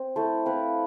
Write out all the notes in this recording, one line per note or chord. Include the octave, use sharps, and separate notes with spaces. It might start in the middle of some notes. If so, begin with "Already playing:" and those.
Already playing: C4
A3 E4 A4 C5
C4 E4 B4 F5